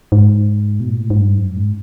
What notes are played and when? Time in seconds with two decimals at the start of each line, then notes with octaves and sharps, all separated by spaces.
0.12 G#2
0.80 B2
0.90 A#2
1.01 A2
1.10 G#2
1.20 G2
1.38 F#2
1.57 G#2